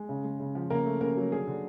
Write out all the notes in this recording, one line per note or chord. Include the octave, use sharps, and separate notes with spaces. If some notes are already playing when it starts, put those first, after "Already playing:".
Already playing: G#3
C#3
G#3
C#3
F3
C#3 A#3 A#4
A3
C#3 A#3 A#4
F#3
D3 G#4
D3